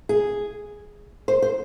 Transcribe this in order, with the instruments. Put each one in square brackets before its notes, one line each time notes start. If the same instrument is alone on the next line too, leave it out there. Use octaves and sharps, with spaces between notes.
[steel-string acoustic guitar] G#4
C5
C5